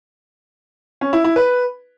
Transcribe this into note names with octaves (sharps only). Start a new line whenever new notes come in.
C#4
E4
E4
B4